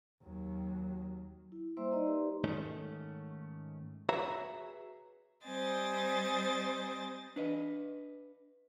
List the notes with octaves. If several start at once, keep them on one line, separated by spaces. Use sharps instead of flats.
D#2 F#3
E4
G3 A#3 C5 E5 C6 E6
D#4 D5 D#5 A#5
D#4 G4 B4 D5 C6
G#2 D#3 A3 C#4
F#4 G#4 B4 C#5 E5 A#5
G3 C4 C5 D#5 G#5 A6
D4 B4 D#5